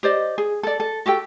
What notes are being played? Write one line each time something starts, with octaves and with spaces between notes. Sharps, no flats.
G4 C5 D5 D#5
G#4
A4 D5
A4
F#4 G4 A4 G5